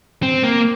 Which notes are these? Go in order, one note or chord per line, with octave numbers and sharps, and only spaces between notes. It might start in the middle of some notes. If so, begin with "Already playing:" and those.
C4
A#3